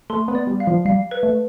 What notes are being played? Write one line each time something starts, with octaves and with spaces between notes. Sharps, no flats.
A3 C6
B3
D5
G3
F5
F3
G3 F5
B4
A3